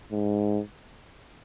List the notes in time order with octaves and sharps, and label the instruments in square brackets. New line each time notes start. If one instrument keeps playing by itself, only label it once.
[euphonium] G#2